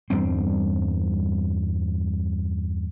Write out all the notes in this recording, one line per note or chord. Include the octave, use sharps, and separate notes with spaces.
E2 G2 G3 C4